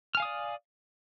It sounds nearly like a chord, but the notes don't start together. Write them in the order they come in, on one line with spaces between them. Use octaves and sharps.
F6 G#5 F5 D#6 D5